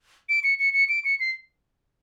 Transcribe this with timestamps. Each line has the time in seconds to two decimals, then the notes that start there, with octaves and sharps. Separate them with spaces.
0.29 D7
0.44 C#7
0.59 C#7
0.74 C#7
0.89 D7
1.05 C#7
1.20 C7